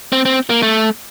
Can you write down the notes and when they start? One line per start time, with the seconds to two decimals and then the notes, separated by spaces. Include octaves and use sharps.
0.12 C4
0.25 C4
0.50 A#3
0.62 A3